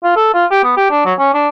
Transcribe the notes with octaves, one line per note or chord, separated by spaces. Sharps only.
F4
A4
F4
G4
B3
G4
D4
F#3
C#4
D4